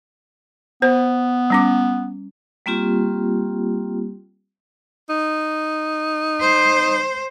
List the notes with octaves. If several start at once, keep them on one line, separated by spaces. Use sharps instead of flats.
B3 C5
G3 C#4 D6
G3 A#3 C4 F4 G4
D#4
C5